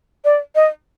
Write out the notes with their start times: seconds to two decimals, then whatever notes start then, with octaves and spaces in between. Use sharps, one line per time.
0.24 D5
0.55 D#5